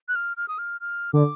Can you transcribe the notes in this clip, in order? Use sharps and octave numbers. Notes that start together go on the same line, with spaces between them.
F#6
F6
F6
D#6
F6
F6
D3 D6